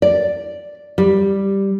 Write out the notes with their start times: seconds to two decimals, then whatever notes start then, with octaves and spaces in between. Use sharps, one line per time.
0.02 D5
0.98 G3